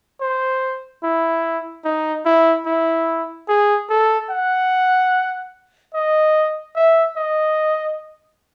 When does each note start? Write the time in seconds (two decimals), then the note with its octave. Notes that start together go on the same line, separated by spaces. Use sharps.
0.21 C5
1.03 E4
1.85 D#4
2.25 E4
2.66 E4
3.49 G#4
3.90 A4
4.30 F#5
5.94 D#5
6.76 E5
7.17 D#5